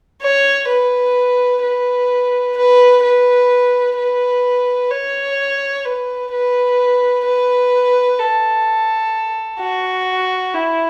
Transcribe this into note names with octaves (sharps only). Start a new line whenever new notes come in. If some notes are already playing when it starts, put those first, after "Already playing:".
C#5
B4
B4
B4
B4
B4
C#5
B4
B4
B4
A4
F#4
E4